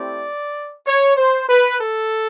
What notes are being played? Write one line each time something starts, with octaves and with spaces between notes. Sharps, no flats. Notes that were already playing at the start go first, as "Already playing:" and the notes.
Already playing: A3 C4 E4 G4 D5
C#5
C5
B4
A4